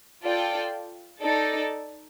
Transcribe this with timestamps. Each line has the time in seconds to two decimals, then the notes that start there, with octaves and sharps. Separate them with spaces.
0.22 F4 A4 D5 G5
1.21 D#4 A4 D5